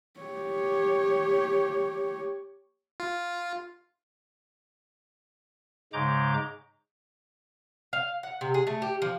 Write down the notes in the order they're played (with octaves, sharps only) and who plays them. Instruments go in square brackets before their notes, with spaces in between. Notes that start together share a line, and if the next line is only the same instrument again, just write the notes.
[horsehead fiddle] G4 C#5
[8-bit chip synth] F4
[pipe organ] G#2 C#3 G#3 A#5 D6 G6
[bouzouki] F5
F#5
C3
G#4
A3
G4
F3